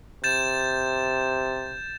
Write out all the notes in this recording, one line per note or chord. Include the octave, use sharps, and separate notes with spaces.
C3 G6 A6 E7